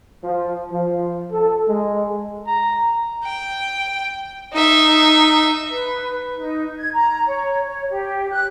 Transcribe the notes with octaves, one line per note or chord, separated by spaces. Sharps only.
F3
F3
A4
G#3
A#5
G5
D#4 E5
B4
D#4
G#6
A#5
C#5
C#5
G4
F#6